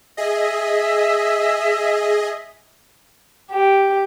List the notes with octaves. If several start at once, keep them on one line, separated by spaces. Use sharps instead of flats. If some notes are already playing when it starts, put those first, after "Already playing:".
G#4 D#5 E5
G4